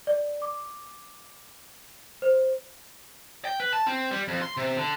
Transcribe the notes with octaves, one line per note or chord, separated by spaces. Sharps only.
D5
D6
C5
G5
B4
A5
C4
G3
F2
C6
C3
D3